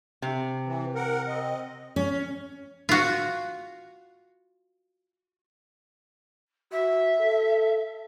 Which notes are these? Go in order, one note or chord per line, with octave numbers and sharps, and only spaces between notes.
C3
E3
A#4 F#5
C4 D#5
C#4
F4 F#4
F#4 E5
A4